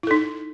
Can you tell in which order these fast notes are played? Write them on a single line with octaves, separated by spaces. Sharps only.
E4 A4 D#4